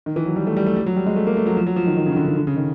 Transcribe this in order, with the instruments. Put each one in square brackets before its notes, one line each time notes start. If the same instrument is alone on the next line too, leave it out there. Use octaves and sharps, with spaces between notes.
[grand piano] D#3
E3
F#3
G3
A3
G3
A3
G3
F#3
G3
G#3
A3
A#3
A3
F#3
F3
F#3
F3
D#3
D#3
C#3
D#3
D3
D#3
D3
C#3
D#3